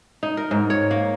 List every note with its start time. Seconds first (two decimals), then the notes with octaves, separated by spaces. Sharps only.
0.23 D#4
0.37 A#4
0.51 G#2
0.70 C#5
0.91 A#3